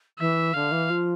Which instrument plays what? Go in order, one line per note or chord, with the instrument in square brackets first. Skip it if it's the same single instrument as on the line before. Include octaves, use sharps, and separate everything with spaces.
[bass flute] E3 [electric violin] E5
[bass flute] D3 [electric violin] F5
[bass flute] E3
F3